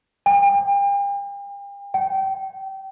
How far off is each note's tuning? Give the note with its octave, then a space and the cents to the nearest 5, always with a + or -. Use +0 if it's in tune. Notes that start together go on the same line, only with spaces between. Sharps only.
G5 +40
G5 -25